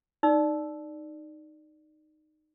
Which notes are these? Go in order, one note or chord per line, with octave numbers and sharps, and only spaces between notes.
D#4 D5 E6